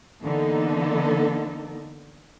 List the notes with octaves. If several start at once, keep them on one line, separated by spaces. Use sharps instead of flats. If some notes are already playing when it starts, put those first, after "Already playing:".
D3 E3 A#3 B3 D#4 A4